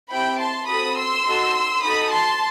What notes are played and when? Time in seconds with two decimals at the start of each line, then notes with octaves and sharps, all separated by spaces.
0.10 C4 E4 G4 G5 B5
0.39 A5 C6
0.67 C4 F#4 A4 B5 D#6
0.96 C6 E6
1.26 D#4 F#4 A4
1.83 D#4 F#4 A4 B5 D#6
2.11 A5 C6